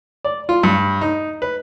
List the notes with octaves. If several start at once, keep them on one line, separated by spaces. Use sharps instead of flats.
D5
F4
G2
D#4
B4